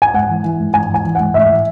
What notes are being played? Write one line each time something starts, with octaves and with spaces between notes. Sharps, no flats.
G#5
G#2 F#5
E3
E3
G#2
G#2 G#5
E3
G#5
E3
G#2 F#5
A2 E5
E3